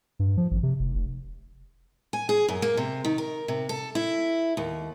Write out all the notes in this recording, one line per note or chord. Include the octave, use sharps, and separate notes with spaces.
G2
F3
G#1
C3
F1
F1
G#5
G#4
F#2
A#3
C3
D#3
A#4
C3
A4
E4
D#2